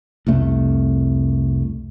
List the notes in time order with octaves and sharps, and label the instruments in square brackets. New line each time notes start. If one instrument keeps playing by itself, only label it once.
[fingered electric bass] C2 F2 A3